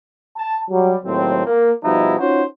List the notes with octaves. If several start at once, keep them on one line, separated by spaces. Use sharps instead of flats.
A5
F#3 G3
D#2 A2 F#3 C4
A#3
B2 F3 G3 D#4 E4
C#4 D#4 F4 F#4 C5